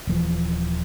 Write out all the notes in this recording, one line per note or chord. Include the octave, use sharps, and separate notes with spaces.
D#1 E3 F3